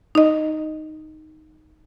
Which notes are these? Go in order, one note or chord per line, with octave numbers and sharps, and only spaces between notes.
D#4 D#5